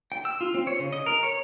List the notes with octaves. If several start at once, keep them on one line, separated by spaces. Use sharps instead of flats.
G5
E6
F4
C4
C#5
C#3
D#5
A#4
C#5